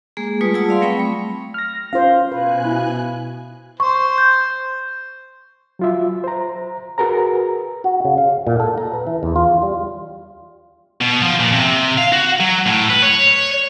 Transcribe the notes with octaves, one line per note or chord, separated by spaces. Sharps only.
G#3 A#3 G#4
G3 A3 F4 B4 D#6
G3 F4 G#4 F#5 A5 E6
D5 F5 C6
F#3 A3 C4 G5 B5 C#6
A3
F6 A#6
C#4 F4 C5 F5
B2 B4 G#5 F#6
E4 B5
C5 C#6
G6
F#3 F4 E5
C5 A#5
F#4 G#4 A#4 B4 A#5
F#4
C#3
F5
A#2
A4
A#5
B4
E3
E2
F4
G3
B2
F3
A#2
C3
F5
F#4
F#3
A2
B4
C#5